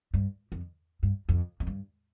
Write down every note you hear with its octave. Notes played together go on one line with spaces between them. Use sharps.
G2
F2
G2
F2
F2
G2